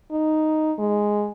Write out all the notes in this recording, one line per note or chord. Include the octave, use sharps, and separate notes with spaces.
D#4
G#3